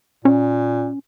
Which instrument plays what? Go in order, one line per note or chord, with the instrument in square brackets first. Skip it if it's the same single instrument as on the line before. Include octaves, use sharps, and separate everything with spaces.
[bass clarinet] A#2 [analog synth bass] C#4